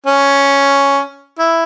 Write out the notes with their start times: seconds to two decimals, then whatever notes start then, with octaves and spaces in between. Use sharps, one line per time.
0.06 C#4
1.39 E4